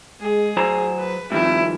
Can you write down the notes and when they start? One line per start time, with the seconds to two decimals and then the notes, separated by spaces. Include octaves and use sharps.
0.21 G#3 G#4
0.57 F#3 C5 G#5 A#5
0.99 B4
1.32 G2 D#3 F3 C4 E4